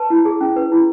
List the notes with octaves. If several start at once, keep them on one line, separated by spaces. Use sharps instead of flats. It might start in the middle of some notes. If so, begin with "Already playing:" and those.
Already playing: B4 A5
E4
G#4
C#4
B4
E4